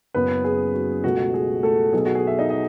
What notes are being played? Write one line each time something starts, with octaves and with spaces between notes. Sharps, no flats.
F#1 F#2 C#3 B3 B4
G#4
F#4
C#2 B2 A3 F#4
G#4
A3 A4
B1 B2 A3 G#4
F#4
G#4
E5
D#4 D#5
D#5